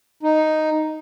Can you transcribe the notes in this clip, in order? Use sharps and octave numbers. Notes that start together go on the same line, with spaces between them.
D#4